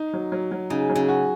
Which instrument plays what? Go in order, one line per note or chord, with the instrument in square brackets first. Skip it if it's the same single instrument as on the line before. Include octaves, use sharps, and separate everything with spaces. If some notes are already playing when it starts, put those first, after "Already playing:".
Already playing: [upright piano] D#4
F#3
F#3
F#3
[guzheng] C#3 [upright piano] D#4
[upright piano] F#3
[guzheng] C#3
[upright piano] F#4